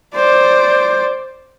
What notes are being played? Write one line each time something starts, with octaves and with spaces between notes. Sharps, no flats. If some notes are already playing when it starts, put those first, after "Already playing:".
C5 D5